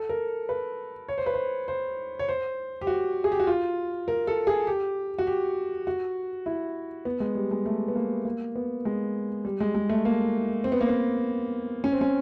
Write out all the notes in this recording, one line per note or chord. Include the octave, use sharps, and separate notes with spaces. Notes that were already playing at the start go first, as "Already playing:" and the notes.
Already playing: A4
A#4
B4
C#5
C5
B4
C5
C5
C#5
C5
G4
F#4
G#4
G4
F#4
F4
A#4
A4
G#4
G4
F#4
G4
F#4
E4
B3
G#3
G3
G#3
A3
B3
A#3
A#3
B3
G#3
G3
G#3
G#3
A3
A#3
C4
B3
A#3
B3
C#4
C4
C#4